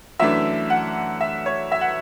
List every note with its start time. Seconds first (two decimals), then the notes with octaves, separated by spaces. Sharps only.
0.20 F#2 E3 A3 D4 E5
0.70 F#5
1.21 E5
1.46 C#5
1.72 E5
1.81 F#5